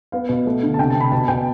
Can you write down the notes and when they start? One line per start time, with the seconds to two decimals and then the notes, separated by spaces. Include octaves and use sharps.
0.12 B3 F5
0.29 B2
0.46 A3
0.63 D3
0.74 A5
0.78 C3 G5
0.90 A5
0.96 C3 B5
1.12 B2 A5
1.28 B2 G5